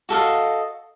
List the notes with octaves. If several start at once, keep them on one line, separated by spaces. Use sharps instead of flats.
F#4 A4 D#5 F5